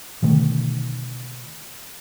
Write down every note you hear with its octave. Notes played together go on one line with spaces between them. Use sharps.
B2 D3 D#3 A3